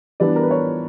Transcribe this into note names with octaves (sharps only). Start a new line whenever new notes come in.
E3 G3 B3 D4 D5
A#4
B4
C#5